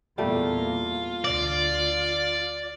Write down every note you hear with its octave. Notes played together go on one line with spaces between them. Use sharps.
E2 A#2 G3 A3 A#3 F4
D2 D5